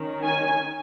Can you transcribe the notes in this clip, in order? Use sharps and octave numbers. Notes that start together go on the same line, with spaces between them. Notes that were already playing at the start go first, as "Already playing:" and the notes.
Already playing: D#3 C#4
G#5